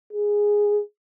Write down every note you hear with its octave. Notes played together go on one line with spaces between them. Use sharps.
G#4